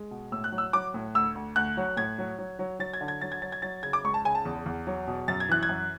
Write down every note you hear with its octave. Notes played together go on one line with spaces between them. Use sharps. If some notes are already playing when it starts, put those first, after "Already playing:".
Already playing: G#3
B2
A2 E6
F#6
F#3
E6
F#3 D6
A2
D2 E6
D2
D2 F#6
F#3
A2 G#6
F#3
F#3
F#3
F#3 A6
G#6
D3
G#6
F#3 A6
G#6
F#3 A6
G#6
F#3 A6
C#3 G#6
D6
C#2 C#6
A5
C#3 G#5
A5
E2
E2
F#3
B2
F#2 A6
G#6
E3 F#6
G#6
F#2